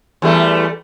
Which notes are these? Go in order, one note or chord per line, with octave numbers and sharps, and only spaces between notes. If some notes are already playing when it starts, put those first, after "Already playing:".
E2 G3 A3